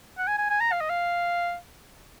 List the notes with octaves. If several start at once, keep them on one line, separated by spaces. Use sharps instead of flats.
F#5
G#5
G#5
G#5
A#5
F5
D#5
F5